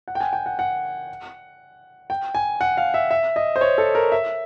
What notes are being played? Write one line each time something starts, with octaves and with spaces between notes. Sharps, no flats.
F#5
G5
G#5
G5
F#5
F#5
G5
G#5
F#5
F5
E5
E5
D#5
C5
C#5
A4
A#4
E5